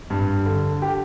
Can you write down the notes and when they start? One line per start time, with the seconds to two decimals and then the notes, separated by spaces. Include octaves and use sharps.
0.10 G2
0.46 D3
0.82 G4